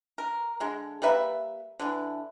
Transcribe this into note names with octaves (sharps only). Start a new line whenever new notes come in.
A#4
D3 G#3
G3 A#3 B4 E5
D3 E3